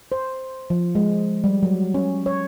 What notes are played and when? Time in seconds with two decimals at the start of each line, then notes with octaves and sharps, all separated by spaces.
0.12 C5
0.70 F3
0.95 G#3
1.44 G3
1.63 F#3
1.94 C#4
2.26 C#5